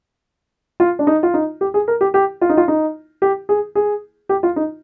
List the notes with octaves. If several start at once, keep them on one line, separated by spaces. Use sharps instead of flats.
F4
D4
D#4
F4
D#4
G4
G#4
A#4
G4
G4
F4
D#4
F4
D#4
G4
G#4
G#4
G4
F4
D#4